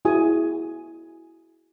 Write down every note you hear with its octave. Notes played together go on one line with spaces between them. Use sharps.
E4 F#4 G#4 G#5 D#6